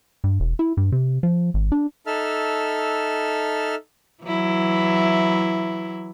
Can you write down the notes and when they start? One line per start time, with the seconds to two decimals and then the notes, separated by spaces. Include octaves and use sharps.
0.24 G2
0.40 E1
0.59 E4
0.77 G2
0.92 C3
1.23 F3
1.54 G#1
1.72 D4
2.07 D#4 A4 E5 A5 F6
4.23 E3 F#3 E4